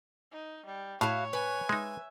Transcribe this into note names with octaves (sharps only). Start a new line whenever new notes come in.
D#4
G3
A2 E4 F#4 C#5 F5
B4 G#5
G#3 D#4 E5